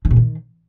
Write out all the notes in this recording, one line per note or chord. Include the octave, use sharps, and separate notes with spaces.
D#3
A#2
D#3